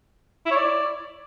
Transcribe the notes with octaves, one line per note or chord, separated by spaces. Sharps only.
E4
C#5
D5